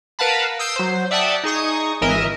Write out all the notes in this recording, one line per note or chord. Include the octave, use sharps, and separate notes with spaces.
A#4 B4 F5 F#5 A5 B5
D#6 E6 G6 C7 D7
F#3 C5
D5 E5 F#5 G5 A5 D#6
D#4 G#4 C#6 D#6
G#1 E3 A#4 D#5 E5